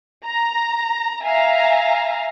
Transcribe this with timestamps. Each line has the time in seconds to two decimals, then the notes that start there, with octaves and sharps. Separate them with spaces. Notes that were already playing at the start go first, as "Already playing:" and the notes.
0.25 A#5
1.23 E5 F5 G#5 A#5